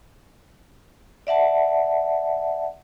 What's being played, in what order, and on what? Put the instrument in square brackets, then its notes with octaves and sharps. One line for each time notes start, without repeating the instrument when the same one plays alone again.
[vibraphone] D5 E5 F#5 A5